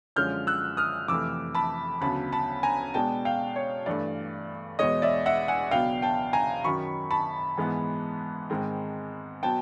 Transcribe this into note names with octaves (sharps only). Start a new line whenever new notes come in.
F#2 D3 F3 G#3 C#4 F6 G6
E6 F#6
D#6 F6
F2 C3 E3 A3 D6 E6
A5 B5
D2 C#3 F#3 B3 A5 B5
A5 B5
G#5 A#5
B2 G#3 B3 D4 G5 A5
F5 G5
C#5
G2 E3 A3 D5
E2 B2 G#3 C#5 D#5
D5 E5
E5 F#5
F#5 G#5
C#2 B2 F#3 B3 D4 F5 G5
G5 A5
G#5 A#5
F#2 D#3 F#3 B5 C#6
A5 B5
G#2 E3 G#3 B3
G#2 D#3 G#3 C4
B2 F#3 B3 G5 A5